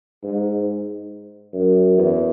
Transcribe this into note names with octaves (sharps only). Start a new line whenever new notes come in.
G#2
F#2
E2